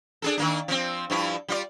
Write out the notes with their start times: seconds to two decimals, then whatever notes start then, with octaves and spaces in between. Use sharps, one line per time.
0.22 D4 G#4 A4
0.38 D#3 A#3 D4
0.68 F3 C4
1.10 G2 F3 E4
1.48 G3 F4 D5